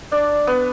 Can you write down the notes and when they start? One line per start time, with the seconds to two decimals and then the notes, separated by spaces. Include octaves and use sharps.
0.12 D4 D5
0.47 B3 B4